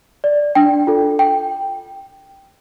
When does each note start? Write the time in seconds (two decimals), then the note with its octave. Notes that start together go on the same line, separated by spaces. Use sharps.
0.24 D5
0.55 D4 G5
0.87 F4 A4
1.19 G5